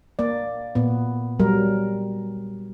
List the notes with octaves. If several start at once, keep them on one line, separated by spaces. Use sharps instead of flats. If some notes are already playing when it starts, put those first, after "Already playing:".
A#3 D5
A#2 B3
F#3 G3 A#4